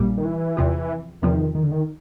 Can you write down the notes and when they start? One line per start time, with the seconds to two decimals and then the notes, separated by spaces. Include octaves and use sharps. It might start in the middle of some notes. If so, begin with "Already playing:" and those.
Already playing: A#1 A#2 G3
0.17 D#3
0.24 E3
0.57 E2 C3 F3
1.22 E2 C3 D#3 F3
1.55 D#3
1.63 D3
1.72 D#3